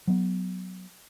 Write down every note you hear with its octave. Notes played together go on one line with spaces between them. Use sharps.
F#3 B3